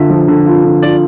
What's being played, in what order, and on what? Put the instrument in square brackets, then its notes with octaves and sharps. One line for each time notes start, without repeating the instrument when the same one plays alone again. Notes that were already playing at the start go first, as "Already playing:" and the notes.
Already playing: [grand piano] D3 F4 [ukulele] E5
[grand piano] F3
D3
F4
D3
[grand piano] F4 [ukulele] D5